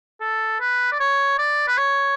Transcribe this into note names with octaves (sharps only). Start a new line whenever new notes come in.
A4
B4
D5
C#5
D5
B4
C#5